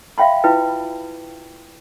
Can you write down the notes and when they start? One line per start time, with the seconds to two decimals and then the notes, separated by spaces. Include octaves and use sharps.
0.18 E5 F5 G5 B5 C6
0.44 E4 F4 B4 G5